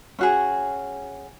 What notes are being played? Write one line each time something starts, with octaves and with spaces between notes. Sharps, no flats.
C#4 F#4 G#4